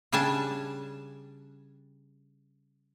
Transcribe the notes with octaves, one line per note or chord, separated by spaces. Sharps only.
C#3 G3 D4 G#5 A5